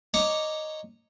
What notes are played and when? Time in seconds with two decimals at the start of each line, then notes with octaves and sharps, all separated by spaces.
0.14 C#5 D#5 A#5 C#6 D6